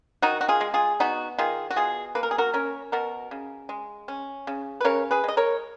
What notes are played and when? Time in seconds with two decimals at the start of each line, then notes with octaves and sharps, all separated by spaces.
0.22 D#3 D#4 F#4
0.41 F#4
0.48 F4 G#4
0.61 G#3
0.74 F4 G#4
1.00 B3 D#4 F#4
1.38 D#3 F4 G#4
1.70 F#4
1.76 B2 F4 G#4
2.15 A#3 B4
2.23 A#4
2.31 G#4
2.38 F#4 A#4
2.54 C#4 A#4 C#5
2.92 B2 F#4 A#4
3.31 C#3
3.69 G#3
4.08 C#4
4.47 C#3
4.81 B4
4.85 C#3 A#4 C#5
5.11 G#4 B4
5.24 G#3 D#5
5.37 A#4 C#5